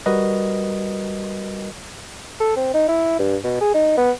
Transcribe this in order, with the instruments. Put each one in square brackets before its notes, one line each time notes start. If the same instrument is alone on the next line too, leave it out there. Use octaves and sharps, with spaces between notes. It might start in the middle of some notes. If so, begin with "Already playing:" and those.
[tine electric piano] G3 F#4 A#4 B4 D#5
[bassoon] A4
C4
D#4
E4
G2
B2
G#4
D#4
B3